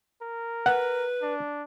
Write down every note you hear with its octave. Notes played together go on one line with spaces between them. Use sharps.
A#4
B4 F#5
D4